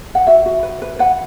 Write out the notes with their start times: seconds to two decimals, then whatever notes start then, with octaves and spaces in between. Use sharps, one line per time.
0.15 F#5
0.27 F#4 E5
0.46 F#4
0.63 B4
0.82 B4
0.99 B4 F#5